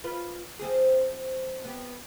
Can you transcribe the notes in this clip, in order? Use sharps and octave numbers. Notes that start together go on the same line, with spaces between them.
F4 B4
F3 C4 G#4
B3 G4